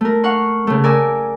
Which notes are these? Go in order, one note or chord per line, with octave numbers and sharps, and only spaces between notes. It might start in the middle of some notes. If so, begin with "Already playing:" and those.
A3 A#4
F5 F#5 C#6
C#3 A3
A#4 D5 G#5 E6